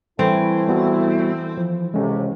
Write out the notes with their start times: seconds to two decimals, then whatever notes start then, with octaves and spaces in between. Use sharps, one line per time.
0.19 E3 G3 A3 C4 E4
0.68 G3 B3 F#4
1.57 F3
1.94 F2 A2 C3 G#3 C#4